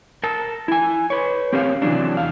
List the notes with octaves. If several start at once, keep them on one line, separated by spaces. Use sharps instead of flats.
A#4 A5
E4 G#5
B4 C#5
C4 C#4 G4 A#4 C#5 F5
C3 E3 F#3 C#4 D4
E2 F5